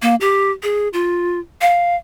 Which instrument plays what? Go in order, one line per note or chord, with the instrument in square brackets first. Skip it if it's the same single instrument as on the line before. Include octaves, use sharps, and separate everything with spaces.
[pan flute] A#3
G4
G#4
F4
F5